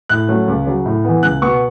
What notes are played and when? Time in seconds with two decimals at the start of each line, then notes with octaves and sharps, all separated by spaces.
0.09 A2 F#6
0.29 F#3 A3 C#4
0.48 C#2
0.66 C#3 F#3
0.85 A2
1.05 E3 B3
1.23 C#2 F#6
1.42 B2 B3 C#6